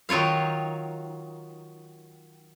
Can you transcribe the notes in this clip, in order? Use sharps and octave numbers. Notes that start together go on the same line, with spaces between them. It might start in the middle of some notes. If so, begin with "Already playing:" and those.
D#3 F#3 F4 C#5 F5